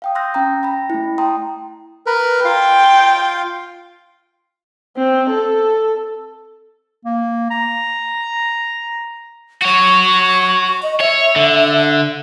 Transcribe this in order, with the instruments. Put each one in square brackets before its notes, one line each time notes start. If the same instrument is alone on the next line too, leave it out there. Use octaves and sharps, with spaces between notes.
[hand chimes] F5 G5 D#6
C6 D#6 E6 F#6 G6 A#6
C#4 G5 A#5
G5 B5 A#6
A3 E4
G5 A5 A#5 C6 D#6
[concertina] A#4 B4
[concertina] F4 F5 [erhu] G5
[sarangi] C4
A4
[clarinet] A#3
A#5
[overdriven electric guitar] F#4 C#5 [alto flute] C#6
[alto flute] D#5
[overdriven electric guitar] C#5 [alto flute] E5
[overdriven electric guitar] D3